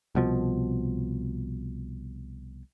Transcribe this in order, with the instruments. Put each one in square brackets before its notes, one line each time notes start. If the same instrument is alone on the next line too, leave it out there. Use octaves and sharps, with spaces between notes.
[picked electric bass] C2 B2 F3